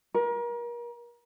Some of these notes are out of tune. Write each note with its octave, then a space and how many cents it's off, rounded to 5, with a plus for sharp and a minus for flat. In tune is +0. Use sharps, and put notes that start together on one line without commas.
A#4 +35